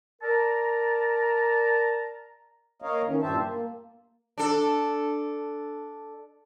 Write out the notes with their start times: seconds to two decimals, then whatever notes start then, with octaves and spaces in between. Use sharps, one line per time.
0.22 A#4 D5 A5 A#5
2.82 A#3 A#4 C#5 D#5 F5
3.05 D#3 E3 C#4
3.22 G2 A#2 G4 C5 E5 A5
3.43 A#3
4.38 D4 A4